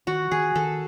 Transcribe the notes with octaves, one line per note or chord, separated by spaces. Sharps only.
D#3 F#4
D#3 G#4
D#3 A4